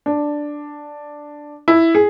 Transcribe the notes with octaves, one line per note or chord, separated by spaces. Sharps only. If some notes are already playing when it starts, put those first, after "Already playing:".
D4
E4
G#4